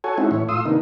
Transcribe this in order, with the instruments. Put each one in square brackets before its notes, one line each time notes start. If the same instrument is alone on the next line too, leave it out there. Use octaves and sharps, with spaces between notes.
[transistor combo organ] F#4 A4 C#5 G#5
G#3 C4 C#4 D#4 E4 F#4
A2 E3 C#5
A2 F4 C6 D#6 E6
C3 D#3 A#3 B3 D4 D#4